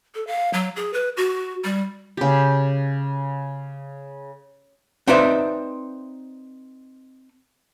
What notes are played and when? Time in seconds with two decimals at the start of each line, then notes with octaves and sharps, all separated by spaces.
0.15 A4
0.27 F5
0.53 F#3
0.76 G#4
0.93 B4
1.17 F#4
1.64 G3
2.17 C#3 G4
5.07 C4 D#4 B4 C5 D5 E5